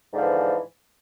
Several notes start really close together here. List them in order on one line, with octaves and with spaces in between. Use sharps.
G#2 D3 F3 E3